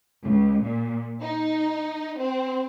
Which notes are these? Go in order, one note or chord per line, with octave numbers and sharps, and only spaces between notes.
C#2
A#2
D#4
C4